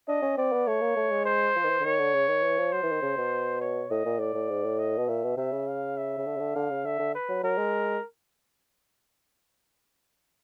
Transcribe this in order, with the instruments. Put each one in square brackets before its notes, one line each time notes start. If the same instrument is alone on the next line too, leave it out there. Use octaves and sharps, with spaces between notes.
[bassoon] D4 [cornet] D#5
[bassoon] C#4
[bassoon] C4 [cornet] D5
[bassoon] B3
[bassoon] A3 [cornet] C#5
[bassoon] A#3
A3
G#3
[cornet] C5
[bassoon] F3
D#3
E3
D3
[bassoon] D#3 [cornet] C#5
[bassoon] D3
C#3
D#3
E3
F3
[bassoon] F#3 [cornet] C5
[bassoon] E3
D#3
C#3
B2
[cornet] C#5
[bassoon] A2 [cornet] D#5
[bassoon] A#2
[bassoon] A2 [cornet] D5
[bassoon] A2
G#2
A2
[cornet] D#5
[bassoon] B2
[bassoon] A#2 [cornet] E5
[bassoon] B2
[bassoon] C3 [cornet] E5
[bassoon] C#3
[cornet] F5
E5
[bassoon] C#3
D3
C#3
D3
[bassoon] D3 [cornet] F5
[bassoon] C#3
[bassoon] D3 [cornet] E5
[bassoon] D3
[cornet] B4
[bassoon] F#3
[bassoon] F#3 [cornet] A#4
[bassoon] G#3